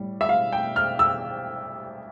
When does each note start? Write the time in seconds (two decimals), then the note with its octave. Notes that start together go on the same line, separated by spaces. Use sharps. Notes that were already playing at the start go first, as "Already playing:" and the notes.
Already playing: A2 G3
0.21 E5
0.29 F5
0.52 G5
0.76 F6
0.99 E6